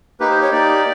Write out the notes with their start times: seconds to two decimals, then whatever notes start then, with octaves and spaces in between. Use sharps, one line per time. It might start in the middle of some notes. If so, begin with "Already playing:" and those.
0.20 A#3 D#4 G4 B4
0.31 C5
0.42 C#5
0.52 A#3 D#4 G4 D5